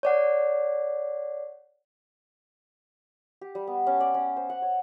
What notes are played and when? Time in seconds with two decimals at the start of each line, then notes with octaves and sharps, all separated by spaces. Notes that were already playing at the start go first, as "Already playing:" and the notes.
0.03 C#5 D5 F#5
3.41 G4
3.55 G3
3.67 B3
3.87 C#4
4.00 D5
4.14 C#4
4.36 C5
4.50 F#5
4.62 C#5